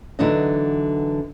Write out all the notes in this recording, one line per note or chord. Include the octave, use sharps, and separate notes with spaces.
D3 E3 F#3 D4 D#4 D#5